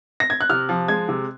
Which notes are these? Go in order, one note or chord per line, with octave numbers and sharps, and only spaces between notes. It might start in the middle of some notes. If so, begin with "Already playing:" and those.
A#6
G#6
F#6
C3 F6
F3
G#3 G#6
C3